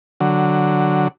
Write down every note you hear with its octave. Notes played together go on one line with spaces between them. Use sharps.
D3 F#3